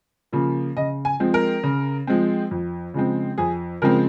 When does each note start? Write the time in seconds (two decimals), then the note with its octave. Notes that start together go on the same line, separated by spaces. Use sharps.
0.33 C#3 F3 A#3
0.77 C#3 D#5
1.05 G#5
1.20 F3 G#3 C4
1.34 A#4
1.64 C#3
2.07 F3 G#3 C4
2.51 F2
2.94 C#3 F3 G#3 C4
3.38 F2 G#4
3.82 C#3 F3 G#3 C4 A#4